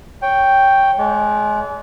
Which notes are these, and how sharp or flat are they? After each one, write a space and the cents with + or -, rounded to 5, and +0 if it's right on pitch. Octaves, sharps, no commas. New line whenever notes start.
C#5 +0 G5 +0
G#3 +25 D5 -40